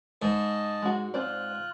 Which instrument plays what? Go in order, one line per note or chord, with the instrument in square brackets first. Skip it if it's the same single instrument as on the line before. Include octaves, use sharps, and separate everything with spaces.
[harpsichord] G#2 [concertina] D#5 A5
[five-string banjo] G#3 F#4
[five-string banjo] C4 C5 D5 [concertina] F4 F#6